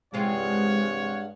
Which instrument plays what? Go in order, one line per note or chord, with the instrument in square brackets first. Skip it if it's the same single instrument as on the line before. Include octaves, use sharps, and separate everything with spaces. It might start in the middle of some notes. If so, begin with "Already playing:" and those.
[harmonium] G2 F5 F#5 [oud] C3 E3 F4 [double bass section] G#3 [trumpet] C#5